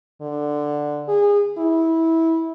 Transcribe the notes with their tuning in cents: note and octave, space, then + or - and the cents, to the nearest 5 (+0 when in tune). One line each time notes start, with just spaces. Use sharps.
D3 +5
G#4 -25
E4 -20